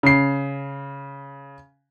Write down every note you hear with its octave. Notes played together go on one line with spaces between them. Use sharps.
C#3 C7